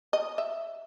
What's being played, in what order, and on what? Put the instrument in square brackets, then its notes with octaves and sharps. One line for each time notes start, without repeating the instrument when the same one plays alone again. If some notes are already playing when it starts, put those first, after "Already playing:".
[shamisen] D#5
E5